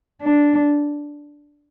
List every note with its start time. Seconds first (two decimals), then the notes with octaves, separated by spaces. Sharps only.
0.22 D4